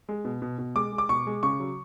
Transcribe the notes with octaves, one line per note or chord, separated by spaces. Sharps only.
G#3
B2
B2
B2
G#3 D6
G#3
D6
B2 C#6
G#3
C#3 C#6
F#3